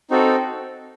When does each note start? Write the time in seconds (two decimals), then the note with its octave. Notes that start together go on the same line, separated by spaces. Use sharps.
0.10 C4 D#4 F#4 A4